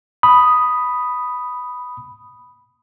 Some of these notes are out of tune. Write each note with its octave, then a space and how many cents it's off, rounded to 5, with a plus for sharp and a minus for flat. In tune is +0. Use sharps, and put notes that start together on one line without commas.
B5 +0 D#6 +0